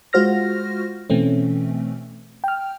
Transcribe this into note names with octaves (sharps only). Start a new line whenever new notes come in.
G#3 F4 F#4 C5 F6 A#6
B2 E3 A3 C4 C#4
G5 F6